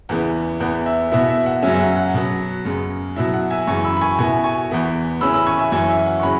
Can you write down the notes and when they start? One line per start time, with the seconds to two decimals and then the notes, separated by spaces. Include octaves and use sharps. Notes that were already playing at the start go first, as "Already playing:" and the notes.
0.09 E2 C#3 E3 B3 F#5
0.60 E2 E3 B3 F#5
0.86 E5
1.12 B2 B3 E4 E5
1.29 E5
1.46 F#5
1.63 F#2 C#3 F#3 C#4 E5
1.74 E5
1.80 F#5
1.97 F#5
2.14 B2 F#3 B3
2.65 F#2 C#3 G#3
3.16 B2 F#3 E4 E5
3.34 F#5
3.50 E5 G#5
3.67 F#2 C#3 E3 G#5 C#6
3.84 B5 E6
3.97 B5
4.01 G#5 C#6
4.19 B2 B3 E4 G#5 C#6
4.44 G#5 C#6
4.70 E2 E3 B3 E4
5.21 C#3 E3 G#3 C#4 B5 E6
5.34 B5 E6
5.47 G#5 C#6
5.59 E5 G#5
5.72 F#2 E3 C#4 E5 G#5
5.90 E5
6.06 F#5
6.20 C#6
6.23 C#3 F#3 C#4 E4 F#5 B5